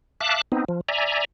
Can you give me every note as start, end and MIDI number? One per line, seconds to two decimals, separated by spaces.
0.21 0.41 76
0.21 0.41 77
0.21 0.41 81
0.21 0.41 86
0.21 0.41 90
0.52 0.65 59
0.52 0.65 60
0.52 0.65 63
0.69 0.81 53
0.89 1.25 74
0.89 1.25 76
0.89 1.25 80
0.89 1.25 82